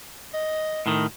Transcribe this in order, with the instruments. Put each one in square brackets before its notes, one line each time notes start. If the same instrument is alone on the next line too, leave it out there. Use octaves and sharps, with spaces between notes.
[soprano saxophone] D#5
[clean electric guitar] A2 D#3